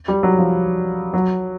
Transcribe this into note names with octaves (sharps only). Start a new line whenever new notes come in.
G3
F#3
F3
F#3